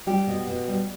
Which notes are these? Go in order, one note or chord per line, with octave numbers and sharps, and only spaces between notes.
G3 G4
B2
B2
G3